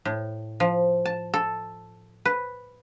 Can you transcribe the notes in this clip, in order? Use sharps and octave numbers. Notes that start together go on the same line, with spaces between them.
A2
F3
A5
A4
B4